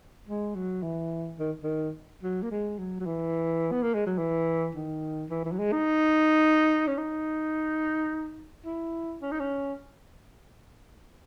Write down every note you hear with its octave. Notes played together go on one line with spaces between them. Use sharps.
G#3
F#3
E3
D#3
D#3
F#3
A#3
G#3
F#3
F#3
E3
B3
A#3
G#3
F#3
E3
D#3
E3
E3
F#3
G#3
D#4
C#4
D#4
E4
C#4
D#4
C#4